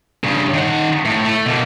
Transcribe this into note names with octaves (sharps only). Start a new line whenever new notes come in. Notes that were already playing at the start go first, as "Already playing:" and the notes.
G2 C#3
D#3 F#5
A2
A3
B2 A#3